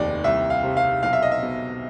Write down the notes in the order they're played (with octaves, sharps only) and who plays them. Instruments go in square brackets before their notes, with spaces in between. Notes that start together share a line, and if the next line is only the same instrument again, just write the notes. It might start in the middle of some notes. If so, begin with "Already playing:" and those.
Already playing: [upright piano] F1 D#2 D5
C2 E5
F5
C3
F5
B1 F5
E5
D#5
E5
B2